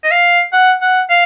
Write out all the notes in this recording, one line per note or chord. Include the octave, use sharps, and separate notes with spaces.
D#5
F5
F#5
F#5
F5